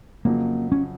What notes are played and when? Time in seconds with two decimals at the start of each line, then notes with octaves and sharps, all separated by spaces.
0.25 F2 C#3 F#3 A#3
0.72 C#4